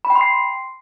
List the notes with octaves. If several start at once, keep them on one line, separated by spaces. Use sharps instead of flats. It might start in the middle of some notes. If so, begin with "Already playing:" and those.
B5
G5
C6
C7